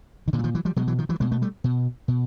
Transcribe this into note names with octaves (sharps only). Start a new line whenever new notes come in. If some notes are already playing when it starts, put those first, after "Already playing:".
D#3
A#2 D3 E3
F#3
D#3 F3
E3 F#3
F3 G3
B2 F#3 G#3
E3 F#3
D#3 F3
E3 F#3
B2 G#3 A#3
A3 B3
G3 A3
B2
B2